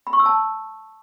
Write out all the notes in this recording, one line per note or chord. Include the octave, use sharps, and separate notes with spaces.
B5
C#6
E6
A5